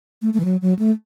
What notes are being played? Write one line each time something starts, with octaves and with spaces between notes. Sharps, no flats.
A3
A3
E3
F#3
F#3
A3